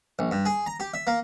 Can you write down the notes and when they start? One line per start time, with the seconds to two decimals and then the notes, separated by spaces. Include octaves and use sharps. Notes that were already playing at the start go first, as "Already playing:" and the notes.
0.19 A#1
0.31 G2
0.45 G#4
0.66 A#5
0.80 G4
0.94 E5
1.07 A#3